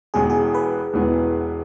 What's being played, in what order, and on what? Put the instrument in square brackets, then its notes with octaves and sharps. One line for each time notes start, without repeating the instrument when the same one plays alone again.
[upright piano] E1 E2 E3 G#3 B3 [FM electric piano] G#4
[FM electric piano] G#4
B4
[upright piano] E1 E2 E3 G#3 B3